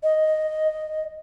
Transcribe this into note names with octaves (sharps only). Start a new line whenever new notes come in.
D#5